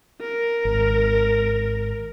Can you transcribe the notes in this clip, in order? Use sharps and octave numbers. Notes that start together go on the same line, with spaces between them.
A#4
G#1